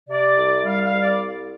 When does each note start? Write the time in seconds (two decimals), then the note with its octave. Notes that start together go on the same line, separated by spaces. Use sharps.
0.09 C3 D5
0.37 C2
0.64 G3 F5
0.83 F5
0.93 C2
1.01 D5